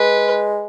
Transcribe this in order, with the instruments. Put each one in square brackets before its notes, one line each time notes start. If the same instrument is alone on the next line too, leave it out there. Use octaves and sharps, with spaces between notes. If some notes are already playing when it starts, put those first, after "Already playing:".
Already playing: [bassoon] G#3 [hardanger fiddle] B4